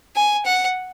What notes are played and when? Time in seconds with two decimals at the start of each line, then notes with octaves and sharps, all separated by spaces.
0.16 G#5
0.45 F#5